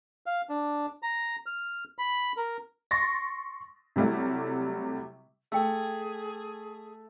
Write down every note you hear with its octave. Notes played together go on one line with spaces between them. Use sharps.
F5
D4
A#5
F6
B5
A#4
C6 C#6 A6 A#6
C3 F#3 G3 A3 E4
A3 G#4 G5 E6